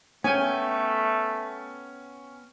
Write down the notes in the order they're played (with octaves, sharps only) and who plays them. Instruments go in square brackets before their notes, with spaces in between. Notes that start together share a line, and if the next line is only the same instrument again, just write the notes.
[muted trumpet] A3 [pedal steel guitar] B3 G5 [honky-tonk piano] C#4 [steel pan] G#5